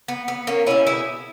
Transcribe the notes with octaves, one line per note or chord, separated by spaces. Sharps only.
B3
B3
A#3 C#4
B2 G3 C#4 E4
E4 G#4